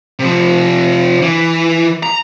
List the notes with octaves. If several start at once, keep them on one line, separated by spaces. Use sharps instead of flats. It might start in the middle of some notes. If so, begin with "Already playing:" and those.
C3 F3
E3
A#5